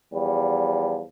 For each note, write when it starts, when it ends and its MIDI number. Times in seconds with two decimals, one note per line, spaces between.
0.13 1.03 40
0.13 1.03 53
0.13 1.03 55